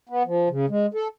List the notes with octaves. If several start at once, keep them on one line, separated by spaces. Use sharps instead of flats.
B3
F3
C#3
G#3
A4